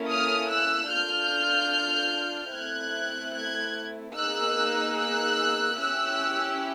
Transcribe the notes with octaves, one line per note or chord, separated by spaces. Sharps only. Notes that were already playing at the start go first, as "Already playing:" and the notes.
Already playing: A#3 C#4 E4 A4
D#6 F6
E6 F#6
D4 F4 A4 F6 G6
A3 C4 E4 F#6 G#6
F#6 G#6
A#3 D#4 G#4 E6 F#6
E6 F#6
C#4 E4 G4 E6 F#6